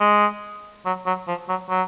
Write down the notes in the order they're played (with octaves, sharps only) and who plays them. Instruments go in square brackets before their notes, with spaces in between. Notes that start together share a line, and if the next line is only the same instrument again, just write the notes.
[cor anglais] G#3
F#3
F#3
F3
F#3
F#3